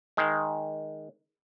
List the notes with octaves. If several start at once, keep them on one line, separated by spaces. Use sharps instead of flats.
D#3 G#3